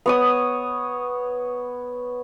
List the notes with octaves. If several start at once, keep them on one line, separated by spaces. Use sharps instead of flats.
B3 C#5 D#6